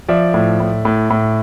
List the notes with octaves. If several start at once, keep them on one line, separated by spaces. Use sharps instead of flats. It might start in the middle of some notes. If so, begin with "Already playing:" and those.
F3 D5 E5
A2
A2
A2
A2